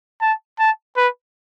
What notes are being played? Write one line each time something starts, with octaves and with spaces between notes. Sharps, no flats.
A5
A5
B4